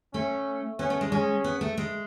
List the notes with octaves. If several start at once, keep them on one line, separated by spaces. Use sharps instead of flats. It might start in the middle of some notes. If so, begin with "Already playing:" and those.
A3 C#4
B3 C#4
A3
G#3
G#3 C#4
B3
A3
G#3